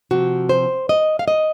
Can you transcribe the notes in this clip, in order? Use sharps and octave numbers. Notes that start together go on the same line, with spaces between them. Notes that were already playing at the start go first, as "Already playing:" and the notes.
C3 F3 C4 F#4
C5
D#5
F5
D#5